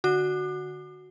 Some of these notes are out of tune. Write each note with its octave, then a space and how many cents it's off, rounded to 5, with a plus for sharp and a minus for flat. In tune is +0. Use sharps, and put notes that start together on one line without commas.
D3 +15 F#4 -5 D6 +40